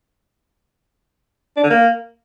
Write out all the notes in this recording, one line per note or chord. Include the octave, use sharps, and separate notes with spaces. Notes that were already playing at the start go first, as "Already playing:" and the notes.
D4
D3
A#3